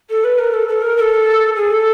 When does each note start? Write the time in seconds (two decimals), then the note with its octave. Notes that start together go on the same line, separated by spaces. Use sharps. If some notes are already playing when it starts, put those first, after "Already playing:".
0.09 A4
0.24 B4
0.38 A#4
0.53 A4
0.68 A4
0.82 A#4
0.97 A#4
1.00 A4
1.55 G#4
1.70 A4